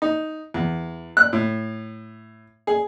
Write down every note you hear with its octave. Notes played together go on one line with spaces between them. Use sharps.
D#4
E2
F#6
A2
G#4